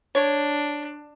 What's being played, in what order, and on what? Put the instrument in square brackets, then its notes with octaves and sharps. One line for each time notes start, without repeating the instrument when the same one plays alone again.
[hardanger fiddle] D4 [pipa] C#5